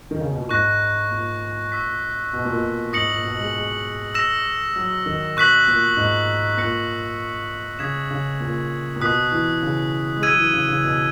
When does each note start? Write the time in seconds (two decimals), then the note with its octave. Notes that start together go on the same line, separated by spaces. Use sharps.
0.11 D#3
0.20 C#3
0.30 B2
0.40 A#2
0.49 G#2 C#6 F#6 A#6
1.11 A#2
1.72 C#6 E6 B6
2.33 B2
2.45 A#2
2.57 B2
2.93 G#2 D#6 A#6 C#7 F#7
3.08 A#2
3.24 B2
3.39 G#3
3.54 G#3
4.14 E6 A#6 E7
4.76 F#3
5.06 D#3
5.36 B2 C#6 F#6 B6 F#7
5.67 A#2
5.97 G#2
6.57 A#2 F#6 A#6 C#7
7.79 C#3 D#6 G#6 B6 E7
8.11 C#3
8.40 A#2
8.96 A#2
9.01 B2 D#6 F#6 B6
9.32 E3
9.62 C#3
10.16 G#3
10.23 F#3 E6 G#6 D#7
10.38 E3
10.53 C#3
10.68 C#3
10.83 B2